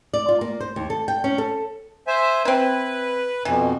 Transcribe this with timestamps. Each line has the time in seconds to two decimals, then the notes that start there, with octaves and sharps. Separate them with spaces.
0.13 D5
0.29 F4
0.41 A#3
0.60 C5
0.76 D#2
0.90 A4
1.08 G5
1.24 C#4
1.38 A4
2.07 C5 E5 G#5
2.45 C4 E4 B4
3.45 F2 B2 E3